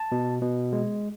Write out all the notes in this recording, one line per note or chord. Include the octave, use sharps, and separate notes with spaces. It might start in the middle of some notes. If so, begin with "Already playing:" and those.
Already playing: A5
B2
B2
G#3